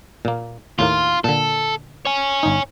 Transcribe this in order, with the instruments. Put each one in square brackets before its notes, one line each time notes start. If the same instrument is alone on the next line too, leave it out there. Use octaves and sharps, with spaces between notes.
[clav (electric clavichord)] A#2 A#3
[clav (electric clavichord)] D#2 A2 A#3 [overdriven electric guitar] F4
[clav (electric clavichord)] A#2 D3 [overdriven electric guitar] A4
[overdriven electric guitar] C#5 G#5
[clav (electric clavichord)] G1 D#4